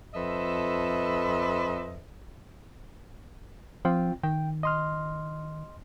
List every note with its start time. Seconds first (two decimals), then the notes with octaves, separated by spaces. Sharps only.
0.14 F2 A4 B4 C5 D#5 E5
3.85 F3 C4 F4 G5
4.24 D#3 G5
4.63 D#5 C6 F6